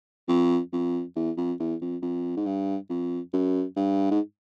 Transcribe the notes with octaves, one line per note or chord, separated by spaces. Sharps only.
F2
F2
E2
F2
E2
F2
F2
G#2
G2
F2
F#2
G2
G#2